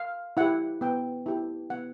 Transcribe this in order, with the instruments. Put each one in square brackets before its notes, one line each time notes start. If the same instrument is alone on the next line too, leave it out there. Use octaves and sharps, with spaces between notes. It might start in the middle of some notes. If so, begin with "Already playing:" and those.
Already playing: [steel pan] F5
E4 G4 F#5
B3 G5
E4 G4
B3 F#5